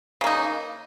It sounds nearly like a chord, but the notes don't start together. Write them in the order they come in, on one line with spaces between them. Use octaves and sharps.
C#3 A#3 D#4